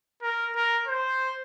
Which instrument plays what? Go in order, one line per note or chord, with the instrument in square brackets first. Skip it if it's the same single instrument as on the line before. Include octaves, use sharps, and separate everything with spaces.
[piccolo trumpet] A#4
A#4
C5